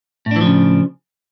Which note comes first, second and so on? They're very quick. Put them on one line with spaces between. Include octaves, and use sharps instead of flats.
A2 D4 E3 F3 C#3